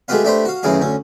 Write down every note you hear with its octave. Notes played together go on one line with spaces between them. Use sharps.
G#3 A3 F#4 G4 B4 F5
A3 D4 G4 B4 C5
F#4 F5
A1 F#2 D#3 E3 G#4 F5
D2 C#4